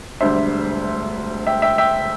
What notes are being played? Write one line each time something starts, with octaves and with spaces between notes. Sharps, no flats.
E1 D2 D3 G3 C5 E5
E5 G5
E5 G5
E5 G5